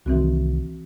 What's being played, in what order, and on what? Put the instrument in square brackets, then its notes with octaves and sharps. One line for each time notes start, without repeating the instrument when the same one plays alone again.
[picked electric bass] C2 D#3 [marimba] E3 C4 F#4